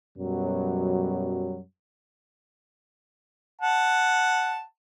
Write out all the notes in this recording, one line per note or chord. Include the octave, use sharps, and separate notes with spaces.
F#2 B2 F#3 G3
F#5 A5